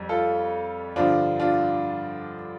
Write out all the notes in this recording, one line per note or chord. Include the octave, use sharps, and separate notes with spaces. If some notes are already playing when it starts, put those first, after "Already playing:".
Already playing: F2 G3
F4 A4
G2 D3 F3 D4 F4
D4 F4